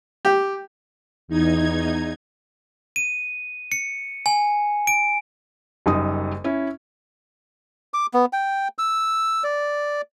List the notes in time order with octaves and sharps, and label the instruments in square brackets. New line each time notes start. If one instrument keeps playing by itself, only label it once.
[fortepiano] G4
[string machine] E2 D#4 G#6
[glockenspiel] D#7
C#7
G#5
D7
[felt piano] F#1 F#2 G3 D#4 D#6
C#4 E4
[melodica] D6
B3
G5
E6
D5